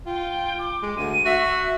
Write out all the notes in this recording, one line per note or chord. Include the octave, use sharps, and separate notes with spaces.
F4 G5
D6
G#3
D2 D#7
F#4 E5